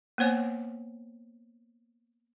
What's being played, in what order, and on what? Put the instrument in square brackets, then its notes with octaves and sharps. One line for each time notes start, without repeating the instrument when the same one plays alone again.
[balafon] A#3 B3 C5 C#5 G#5